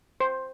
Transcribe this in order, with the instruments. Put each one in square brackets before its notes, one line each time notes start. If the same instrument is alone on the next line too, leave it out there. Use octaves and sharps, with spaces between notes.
[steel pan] C5